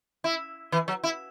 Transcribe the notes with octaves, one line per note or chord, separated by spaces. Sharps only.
E4
E3
F#3
E4